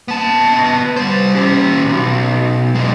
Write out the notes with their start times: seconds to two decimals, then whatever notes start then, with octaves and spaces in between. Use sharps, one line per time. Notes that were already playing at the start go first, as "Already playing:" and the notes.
0.08 B3 A5
0.96 G3 C5
1.35 C#4 G4
1.85 B1
2.75 F#2 G#3